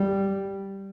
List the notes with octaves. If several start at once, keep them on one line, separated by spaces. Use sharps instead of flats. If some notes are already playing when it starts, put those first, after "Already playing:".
Already playing: G3